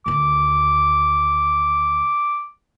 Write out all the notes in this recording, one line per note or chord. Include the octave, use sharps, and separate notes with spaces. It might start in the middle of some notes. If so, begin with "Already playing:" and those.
D2 D#3 D6